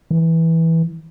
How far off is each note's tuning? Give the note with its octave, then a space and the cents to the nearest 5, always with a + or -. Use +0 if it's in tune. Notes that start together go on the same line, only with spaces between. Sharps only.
E3 -10